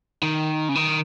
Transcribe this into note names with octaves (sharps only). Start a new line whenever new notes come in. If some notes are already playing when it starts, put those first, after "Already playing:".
D#3
C#3
D#3